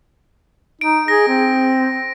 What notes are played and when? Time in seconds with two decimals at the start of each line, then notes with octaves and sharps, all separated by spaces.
0.81 D#4 D7
1.08 G#4 A#6
1.28 C4